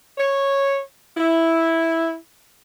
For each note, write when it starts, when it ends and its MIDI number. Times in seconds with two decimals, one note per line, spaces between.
0.18 0.80 73
1.17 2.14 64